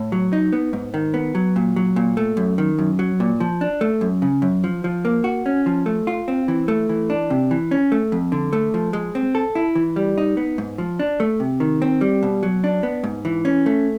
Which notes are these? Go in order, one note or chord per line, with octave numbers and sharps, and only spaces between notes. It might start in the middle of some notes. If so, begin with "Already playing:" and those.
Already playing: A2
F#3
D#4
B3
G#2
D#3
B3
F#3
A#2
F#3
A#2
A3
F#2
D#3
F#2
F#3
A#2
F3
D4
A3
F#2
C#3
F#2
F3
F3
A#3
F#4
C#4
F3
A3
F4
C4
E3
A3
E3
D4
C3
E3
C#4
A3
F2
D3
A3
F3
G#3
C4
A4
E4
E3
G3
D#4
B3
G#2
F3
D4
A3
C3
D#3
C4
G3
B2
F#3
D4
B3
G#2
E3
C#4
A3